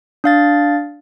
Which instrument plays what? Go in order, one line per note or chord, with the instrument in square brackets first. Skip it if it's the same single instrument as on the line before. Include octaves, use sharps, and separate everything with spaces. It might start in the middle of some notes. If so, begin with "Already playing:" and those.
[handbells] D4 F5 A6